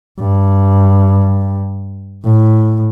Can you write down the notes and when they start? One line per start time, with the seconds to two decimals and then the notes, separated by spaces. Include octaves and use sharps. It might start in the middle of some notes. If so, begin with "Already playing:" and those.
0.20 G2
2.24 A2